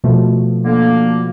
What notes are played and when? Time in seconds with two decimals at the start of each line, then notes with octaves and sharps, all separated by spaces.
0.04 B2 F3 A3
0.64 D3 A#3